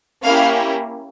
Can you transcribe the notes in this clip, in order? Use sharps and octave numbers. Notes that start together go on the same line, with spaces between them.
A#3 C#4 E4 G4 F5